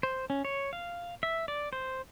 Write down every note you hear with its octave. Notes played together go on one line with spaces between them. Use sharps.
C5
C#4
C#5
F5
E5
D5
C5